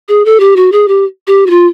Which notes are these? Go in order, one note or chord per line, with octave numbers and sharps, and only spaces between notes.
G#4
A4
G4
F#4
G#4
G4
G4
F#4
F4